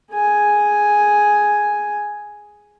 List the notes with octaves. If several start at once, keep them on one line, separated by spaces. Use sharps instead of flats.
G#4 G#5